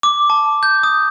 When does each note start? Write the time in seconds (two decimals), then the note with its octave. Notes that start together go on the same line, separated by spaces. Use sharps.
0.03 D6
0.30 A5
0.63 G6
0.83 D#6